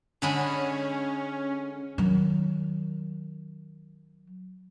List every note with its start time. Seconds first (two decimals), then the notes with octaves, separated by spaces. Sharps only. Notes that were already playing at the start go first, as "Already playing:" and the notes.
0.22 D3 G#3 C#4 B5
1.98 D#3 F#3